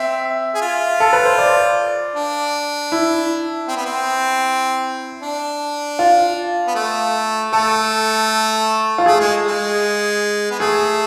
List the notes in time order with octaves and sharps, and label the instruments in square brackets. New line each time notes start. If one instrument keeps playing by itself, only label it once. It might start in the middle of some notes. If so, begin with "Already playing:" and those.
Already playing: [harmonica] C4 [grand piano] E5
[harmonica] G#4
F4
[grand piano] A4
B4
C5
D5
[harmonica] D4
[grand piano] E4
[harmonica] C4
B3
C4
D4
[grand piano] F4
[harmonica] B3
A3
[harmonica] A3 [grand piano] A4
[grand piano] F4
[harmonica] A3 [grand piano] G#4
[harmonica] G#3
G#3
B3
[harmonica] A3 [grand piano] G#4